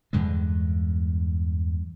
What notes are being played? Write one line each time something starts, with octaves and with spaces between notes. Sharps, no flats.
E2 G2 D3 G#3